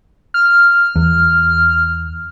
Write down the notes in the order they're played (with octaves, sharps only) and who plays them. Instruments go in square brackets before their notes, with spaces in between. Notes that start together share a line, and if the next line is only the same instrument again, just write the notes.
[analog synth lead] F6
[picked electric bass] E2